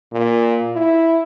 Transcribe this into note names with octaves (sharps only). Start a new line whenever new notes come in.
A#2
E4